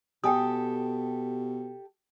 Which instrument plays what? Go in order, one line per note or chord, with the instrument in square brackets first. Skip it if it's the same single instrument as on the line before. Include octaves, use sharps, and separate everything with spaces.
[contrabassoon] B2 [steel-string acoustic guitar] G4 A4 [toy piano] G5 G#5 D#6